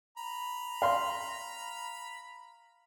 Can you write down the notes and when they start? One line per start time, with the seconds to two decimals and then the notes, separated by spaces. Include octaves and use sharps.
0.18 A#5 B5
0.82 F5 C6